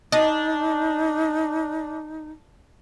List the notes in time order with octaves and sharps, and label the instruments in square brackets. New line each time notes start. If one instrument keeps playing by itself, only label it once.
[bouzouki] D4 [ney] D#4 [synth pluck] D#5